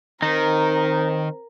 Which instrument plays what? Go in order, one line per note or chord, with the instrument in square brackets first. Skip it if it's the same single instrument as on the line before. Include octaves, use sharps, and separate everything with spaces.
[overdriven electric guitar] D#3 [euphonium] C4 [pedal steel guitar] D#4 [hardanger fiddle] A#4